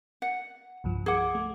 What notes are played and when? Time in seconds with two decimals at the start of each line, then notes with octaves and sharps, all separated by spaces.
0.22 F#5
0.84 C2 G2 F3
1.06 G#4 F#5 D6 G#6
1.35 A3